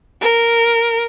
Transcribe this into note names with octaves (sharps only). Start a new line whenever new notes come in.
A#4